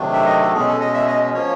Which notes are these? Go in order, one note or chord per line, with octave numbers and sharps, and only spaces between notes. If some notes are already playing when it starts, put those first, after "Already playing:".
Already playing: C3 D#3 F#3 A3 D4
E5
D#5
A4
B2 G#3 C#4 G#4
A4
D#5
E5
D#5
F3 A#3 C#4 C#5